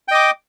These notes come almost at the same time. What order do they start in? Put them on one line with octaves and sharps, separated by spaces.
G5 D#5 D6